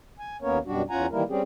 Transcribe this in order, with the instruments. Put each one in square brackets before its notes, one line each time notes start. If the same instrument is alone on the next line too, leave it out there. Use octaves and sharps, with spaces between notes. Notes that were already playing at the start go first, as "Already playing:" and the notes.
[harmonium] G#5
D#2 A#3 B3 C#4 A#4 C#5
F#2 B2 G3 D4 F#4
E2 C#4 F4 F#5 G#5 A#5
D#3 E3 G3 A#3 E4 A#4
G3 C4 C#4 G4 G#4